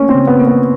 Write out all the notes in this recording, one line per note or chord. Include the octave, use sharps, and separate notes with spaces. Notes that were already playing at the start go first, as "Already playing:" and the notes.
Already playing: A3 A#3 C#4
C4
C#3
B3
A#3
B3